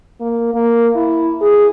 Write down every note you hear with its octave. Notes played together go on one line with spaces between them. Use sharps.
A#3
A#3
E4
G#4